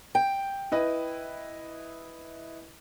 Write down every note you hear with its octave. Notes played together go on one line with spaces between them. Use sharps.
G5
E4 B4 D#5